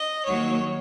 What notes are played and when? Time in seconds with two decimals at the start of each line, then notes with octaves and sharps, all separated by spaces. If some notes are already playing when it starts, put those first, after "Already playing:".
Already playing: D#5
0.24 D#2 D#3 F#3 A#3 C#5